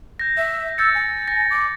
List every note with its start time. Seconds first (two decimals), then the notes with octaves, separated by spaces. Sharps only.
0.19 G6 A#6
0.37 E5
0.78 E6 G6 A6 C#7
0.95 G#5
1.28 A#6
1.51 D6